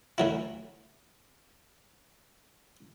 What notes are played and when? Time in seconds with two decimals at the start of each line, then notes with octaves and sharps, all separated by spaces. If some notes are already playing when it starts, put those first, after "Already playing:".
0.18 D2 F#3 E4